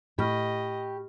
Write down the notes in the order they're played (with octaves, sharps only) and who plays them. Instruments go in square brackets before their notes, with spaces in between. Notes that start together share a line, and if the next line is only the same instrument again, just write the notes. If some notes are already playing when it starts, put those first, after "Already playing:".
[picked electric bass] A2 [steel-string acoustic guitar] G4 [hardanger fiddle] D#5 [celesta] B5 C#6 F6